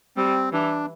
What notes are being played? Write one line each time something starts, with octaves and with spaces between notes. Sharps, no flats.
G3 C4
E3 D4